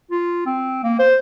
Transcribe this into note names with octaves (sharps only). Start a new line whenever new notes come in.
F4
C4
A#3
C5